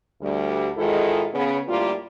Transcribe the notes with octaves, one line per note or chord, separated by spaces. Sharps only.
D2 G3
G#2 D#3 G#3 E4 F4 A4
C#3 B3
D2 A2 G3 A#3 F4